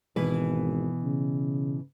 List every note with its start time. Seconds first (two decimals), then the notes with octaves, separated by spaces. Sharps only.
0.16 G#1 B2 E3 B4
1.04 C#3